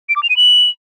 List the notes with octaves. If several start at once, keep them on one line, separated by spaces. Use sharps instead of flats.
D7
D6
F7
D#7
F#7